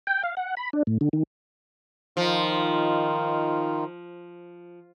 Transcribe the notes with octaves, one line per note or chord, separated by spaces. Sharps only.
G5
F5
F#5
B5
D4
A2
D3
D#3
D#3 F3 D#4 F4